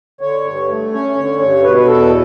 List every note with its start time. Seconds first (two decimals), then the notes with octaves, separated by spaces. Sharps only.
0.21 D3 C#5
0.45 G2
0.68 A3
0.93 C#4 C#5
1.16 D3 C#5
1.39 G2 C#5
1.63 B2 B4
1.77 B4
1.87 E2 A4